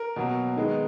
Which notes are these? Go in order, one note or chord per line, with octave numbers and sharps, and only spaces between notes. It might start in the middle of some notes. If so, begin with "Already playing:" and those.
Already playing: A#4
B2 F#3 A#3
D#3 G#3 B3